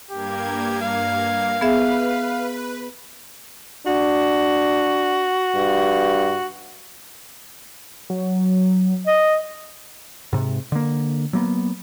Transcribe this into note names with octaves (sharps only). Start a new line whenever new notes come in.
G2 A#3 G4 G#6
F5
B3 G#4 B4 E5
D4 F#4
G2
F#3
D#5
G#2 C3
D3 A#3
F#3 A#3 B3